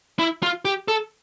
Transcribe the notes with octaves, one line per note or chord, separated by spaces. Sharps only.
E4
F4
G4
A4